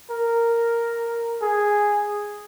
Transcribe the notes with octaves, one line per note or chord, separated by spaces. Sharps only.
A#4
G#4